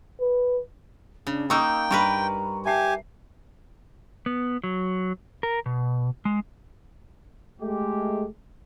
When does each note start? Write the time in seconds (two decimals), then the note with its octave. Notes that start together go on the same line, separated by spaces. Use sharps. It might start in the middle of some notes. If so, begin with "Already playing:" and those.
0.20 B4
1.27 C#3 D4
1.50 A#3 D#4 G5 A#5 C#6 D#6 E6
1.91 G2 G3 A#4 B4 C6 C#6
2.65 G4 E5 G#5 A5 C7
4.26 B3
4.64 F#3
5.43 A#4
5.66 B2
6.25 G#3
7.61 G#3 A3 G4